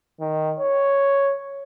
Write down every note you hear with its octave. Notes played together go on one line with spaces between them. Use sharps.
D#3
C#5